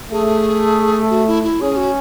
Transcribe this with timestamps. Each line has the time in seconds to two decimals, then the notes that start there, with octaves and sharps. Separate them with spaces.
0.12 A3 G#4
1.11 F#4
1.27 E4
1.44 E4
1.61 C#4 G#4
1.77 F#4